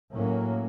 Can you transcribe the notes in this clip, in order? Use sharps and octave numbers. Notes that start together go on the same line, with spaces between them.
A2 F#3 A#3 C#4